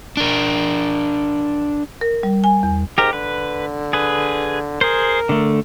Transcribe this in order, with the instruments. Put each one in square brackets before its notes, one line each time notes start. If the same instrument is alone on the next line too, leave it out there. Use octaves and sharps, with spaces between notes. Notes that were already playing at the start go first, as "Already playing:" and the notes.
[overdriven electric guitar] D4 A#4
[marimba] A#4
G3
G#5
E2
[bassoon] G#2 [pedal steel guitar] G4 A#4
[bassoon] D3 [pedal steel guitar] B4
[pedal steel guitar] G#4 B4
[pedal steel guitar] G#4 C5 [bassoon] A#4
[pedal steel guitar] D3 A3